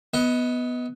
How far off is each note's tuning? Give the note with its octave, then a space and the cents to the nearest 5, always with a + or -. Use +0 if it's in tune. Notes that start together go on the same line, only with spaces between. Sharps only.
B3 +0 D#5 +25